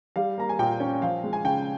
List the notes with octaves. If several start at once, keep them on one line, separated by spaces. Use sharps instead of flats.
G3 F5
A#3 A#5
G#5
A#2 G5
C#4
F3 F5
G#3
G#5
C#3 G5